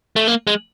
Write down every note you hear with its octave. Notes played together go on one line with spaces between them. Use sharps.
A3
A#3
G#3